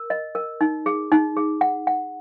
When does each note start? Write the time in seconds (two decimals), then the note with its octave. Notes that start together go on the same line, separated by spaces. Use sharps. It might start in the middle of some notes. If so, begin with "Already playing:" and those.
Already playing: A#4
0.10 D#5
0.35 A#4
0.61 D#4
0.86 G#4
1.12 D#4
1.37 G#4
1.61 F#5
1.87 F#5